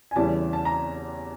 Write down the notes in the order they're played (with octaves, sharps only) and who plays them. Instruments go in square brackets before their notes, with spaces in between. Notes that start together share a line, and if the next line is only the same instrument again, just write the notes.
[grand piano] G#5
E2 C#3 E3 G3 A5
A5
A#5